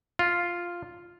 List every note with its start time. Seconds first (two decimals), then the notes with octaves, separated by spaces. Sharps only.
0.19 F4